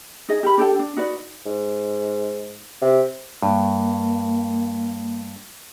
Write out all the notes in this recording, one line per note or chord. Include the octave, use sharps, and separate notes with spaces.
D#4 G#4 D#5
G4 A#4 B5
D4 G4 A4 G5
D4
D#4 F#4 B4 D5
G#2
C3
G2 A#3